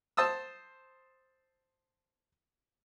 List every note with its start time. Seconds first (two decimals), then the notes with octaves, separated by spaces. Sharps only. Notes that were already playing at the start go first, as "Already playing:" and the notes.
0.17 C5 A5 D#6 E6